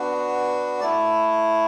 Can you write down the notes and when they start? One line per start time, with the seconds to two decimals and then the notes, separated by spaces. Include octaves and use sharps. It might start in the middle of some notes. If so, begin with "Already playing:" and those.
Already playing: B3 D4 F#4
0.80 A3 E4 D5